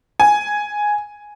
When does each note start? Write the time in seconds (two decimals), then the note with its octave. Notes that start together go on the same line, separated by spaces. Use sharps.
0.20 G#5